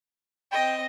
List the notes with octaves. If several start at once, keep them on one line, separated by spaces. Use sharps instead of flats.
C4 D#5 G5